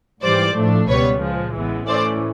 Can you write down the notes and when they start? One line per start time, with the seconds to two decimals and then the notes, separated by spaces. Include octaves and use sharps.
0.22 G#2 E3 G3 C5 D5
0.55 A2 F3 A3 D4
0.88 C#2 B2 G3 B3 B4 C#5
1.21 A#2 F3 G#3
1.54 A1 A2 E3 G#3 B3
1.87 A2 E3 A3 C#4 E4 C5 D5